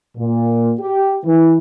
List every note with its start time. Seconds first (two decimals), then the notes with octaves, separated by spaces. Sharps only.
0.17 A#2
0.80 G4
1.25 E3